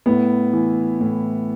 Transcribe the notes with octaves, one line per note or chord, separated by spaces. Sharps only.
A2 B3
E3
A2